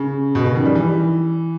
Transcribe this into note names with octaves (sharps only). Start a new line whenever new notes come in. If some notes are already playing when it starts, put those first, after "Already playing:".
Already playing: C#3
B2
C#3
D#3
G3
E3